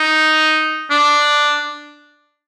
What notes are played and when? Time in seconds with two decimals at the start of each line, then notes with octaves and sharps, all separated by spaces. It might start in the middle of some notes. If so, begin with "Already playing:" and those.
Already playing: D#4
0.91 D4